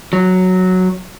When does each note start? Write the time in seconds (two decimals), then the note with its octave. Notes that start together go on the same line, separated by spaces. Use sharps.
0.13 F#3